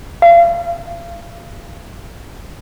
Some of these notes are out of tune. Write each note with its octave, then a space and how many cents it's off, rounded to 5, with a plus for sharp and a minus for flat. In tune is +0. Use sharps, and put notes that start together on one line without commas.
F5 -30